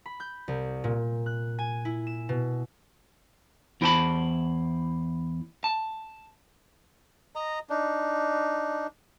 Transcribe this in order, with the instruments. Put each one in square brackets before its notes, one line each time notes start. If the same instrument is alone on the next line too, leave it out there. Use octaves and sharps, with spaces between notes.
[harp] B5
G6
C2
A#2
F#6
G#5
E4
E7
B2
[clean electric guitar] E2 E4 C5 G5 A5 B5
A5
[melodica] D#5 A#5
D4 D#4